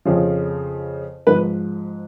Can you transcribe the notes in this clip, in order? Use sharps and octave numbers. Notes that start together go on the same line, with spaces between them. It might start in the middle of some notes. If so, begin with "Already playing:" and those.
F2 C#3 F3
G#2 F3 B4